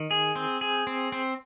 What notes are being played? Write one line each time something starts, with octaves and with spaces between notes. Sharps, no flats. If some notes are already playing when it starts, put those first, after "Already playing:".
Already playing: D#3
G#4
C4
G#4
C4
C4